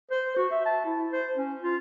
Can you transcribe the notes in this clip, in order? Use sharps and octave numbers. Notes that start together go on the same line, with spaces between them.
C5
F#4
E5
A5
E4
C5
C#4
F4